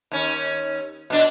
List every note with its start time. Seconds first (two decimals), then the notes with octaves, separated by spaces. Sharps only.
0.11 D#2 C#4
1.10 B2 D4